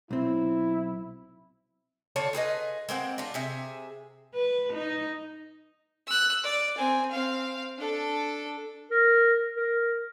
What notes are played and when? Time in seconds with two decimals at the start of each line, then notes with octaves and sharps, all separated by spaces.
0.11 B1 C4 E4
2.16 D3 F4 C#5 A5
2.33 F4 G#4 B4 D#5
2.89 G#3 A#3 C4 F#5
3.18 D4 F4
3.34 C3 G#4 E5
4.35 B4
4.73 D#4
6.07 E6 F#6
6.44 D5
6.77 C4 G#5
7.11 C4 F5
7.78 D4 A4
8.91 A#4
9.57 A#4